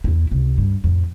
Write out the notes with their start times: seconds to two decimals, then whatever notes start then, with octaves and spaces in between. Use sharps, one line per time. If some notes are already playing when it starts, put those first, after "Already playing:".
0.04 E2 E4
0.31 C#2 C3
0.58 G2
0.84 F2 A2